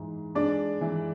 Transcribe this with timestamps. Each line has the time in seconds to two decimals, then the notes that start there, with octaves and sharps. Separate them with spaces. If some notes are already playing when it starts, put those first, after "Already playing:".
Already playing: G#2 E3 G#3
0.35 G#3 D4 D5
0.81 E3